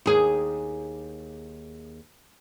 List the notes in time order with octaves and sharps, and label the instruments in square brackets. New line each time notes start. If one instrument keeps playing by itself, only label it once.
[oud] D#2 G#4